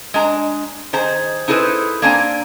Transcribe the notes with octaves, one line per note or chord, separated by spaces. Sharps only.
G#3 D4 A#5
D#3 G#4 C5 A#5
D#4 E4 G#4 A4 B4 C5
A#3 C4 D4 G#5 A#5